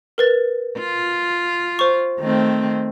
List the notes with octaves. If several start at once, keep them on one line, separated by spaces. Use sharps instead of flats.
A#4 B4 A6
F4
C5 C#6
D#3 A3 C4